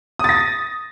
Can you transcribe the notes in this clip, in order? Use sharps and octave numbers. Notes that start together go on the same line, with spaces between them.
D#6 A6 A#6